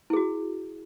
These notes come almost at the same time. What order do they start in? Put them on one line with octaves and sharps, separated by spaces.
E4 G#4 F#4